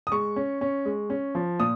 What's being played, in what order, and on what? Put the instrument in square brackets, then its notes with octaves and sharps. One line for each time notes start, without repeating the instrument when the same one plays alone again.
[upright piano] D#6
G#3 C#6
C#4
C#4
G#3
C#4
F3
A#2 D#6